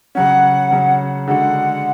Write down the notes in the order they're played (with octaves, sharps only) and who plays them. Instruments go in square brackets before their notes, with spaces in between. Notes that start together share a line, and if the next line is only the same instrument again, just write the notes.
[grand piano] C#3 F#3 C#4 [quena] F#5
[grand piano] C#3 F#3 C#4
[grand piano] D3 G#3 D4 F#4 [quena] F#5